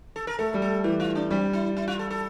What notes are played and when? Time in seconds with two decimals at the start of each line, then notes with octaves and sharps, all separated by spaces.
0.16 A4
0.27 A#4
0.39 A3 A4
0.54 G3
0.62 A4
0.84 E3 G4
1.00 F4
1.15 D4
1.30 G3 C4
1.53 E4
1.77 E4
1.88 F4
1.99 A4
2.10 A4